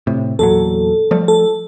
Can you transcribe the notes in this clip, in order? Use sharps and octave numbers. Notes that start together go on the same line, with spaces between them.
A2 C3
E2 A#2 F#3 A4
F3 G3 A3
A4